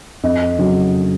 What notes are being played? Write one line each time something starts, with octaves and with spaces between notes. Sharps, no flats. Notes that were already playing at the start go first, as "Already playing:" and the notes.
F2 D#5
C#3 F#3